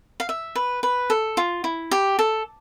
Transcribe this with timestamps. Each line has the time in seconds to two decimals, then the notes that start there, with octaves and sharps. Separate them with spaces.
0.20 F5
0.29 E5
0.55 B4
0.83 B4
1.10 A4
1.37 F4
1.64 E4
1.91 G4
2.19 A4